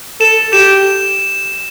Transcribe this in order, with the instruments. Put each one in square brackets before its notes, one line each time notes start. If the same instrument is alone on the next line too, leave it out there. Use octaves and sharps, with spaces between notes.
[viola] A4 [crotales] E7
[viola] G4 [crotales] E7